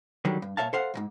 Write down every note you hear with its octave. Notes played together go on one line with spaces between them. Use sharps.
D3 D#3 F#3 G3
G2
A#2 E3 C#5 E5 F5 A5
A4 C5 F5 F#5
B1 G#2